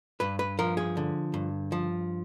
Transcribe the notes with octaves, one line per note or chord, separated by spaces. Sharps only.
G2 B4
B4
F3 A#4
G#4
D3
G2
F3